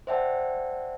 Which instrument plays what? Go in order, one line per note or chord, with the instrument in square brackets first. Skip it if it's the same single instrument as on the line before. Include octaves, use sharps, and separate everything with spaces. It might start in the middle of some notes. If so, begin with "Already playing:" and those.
[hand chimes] C5 D5 E5 F#5 G5 A5